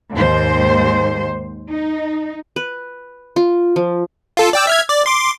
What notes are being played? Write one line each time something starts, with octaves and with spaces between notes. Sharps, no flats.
D#2 G#2 C5
D#4
B4
F4
F3
F4 A4
D5 G5 E6
E5 F6 G#6
D5
C6 D6